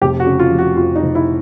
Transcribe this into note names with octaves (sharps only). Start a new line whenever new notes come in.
F1 G4
F#4
C#3
F4
F3
F#4
F2 F4
D#4
F1
E4